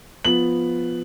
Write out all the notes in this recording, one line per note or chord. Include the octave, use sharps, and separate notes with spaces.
F3 B3 F#7